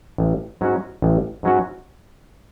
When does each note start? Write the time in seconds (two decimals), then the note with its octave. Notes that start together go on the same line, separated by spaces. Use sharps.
0.18 A1
0.61 G#2 F#3 C#4 F#4
1.02 A1
1.43 G#2 F#3 C#4 F#4